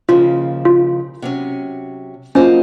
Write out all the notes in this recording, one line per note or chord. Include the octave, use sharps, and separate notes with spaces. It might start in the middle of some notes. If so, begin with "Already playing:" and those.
D#2 C#3 F3 A#3 F4
F4
C3 F#3 C#4
F#3 A#3 C#4 F4 C5 D#5